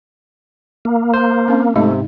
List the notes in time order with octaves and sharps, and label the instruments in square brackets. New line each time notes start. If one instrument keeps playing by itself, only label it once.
[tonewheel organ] A#3
[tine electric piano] C5
[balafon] C4 C#4
[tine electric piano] G#2 C3 [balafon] G#3 D#4 D#5 [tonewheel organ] A3